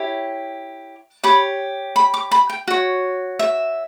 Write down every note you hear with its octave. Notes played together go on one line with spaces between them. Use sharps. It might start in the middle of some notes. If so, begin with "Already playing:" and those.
Already playing: E4 G4 C#5
G4 C#5 B5
B5
D6
B5
G5
F#4 C#5
E5